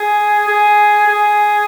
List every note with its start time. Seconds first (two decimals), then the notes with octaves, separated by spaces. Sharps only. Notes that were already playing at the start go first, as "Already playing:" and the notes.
Already playing: G#4
0.48 G#4
1.07 G#4